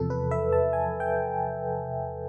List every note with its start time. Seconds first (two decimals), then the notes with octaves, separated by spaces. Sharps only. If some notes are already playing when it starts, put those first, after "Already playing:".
Already playing: E2 C3 F3 A4
0.10 B4
0.31 E5
0.53 A5
0.73 G#5
1.00 G5